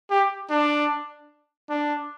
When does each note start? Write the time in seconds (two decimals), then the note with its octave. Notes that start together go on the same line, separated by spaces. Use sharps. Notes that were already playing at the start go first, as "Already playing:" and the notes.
0.10 G4
0.50 D4
1.70 D4